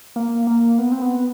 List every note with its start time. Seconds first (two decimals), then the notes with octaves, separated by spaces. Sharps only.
0.16 A#3
0.47 A#3
0.79 B3
0.92 C4
1.02 B3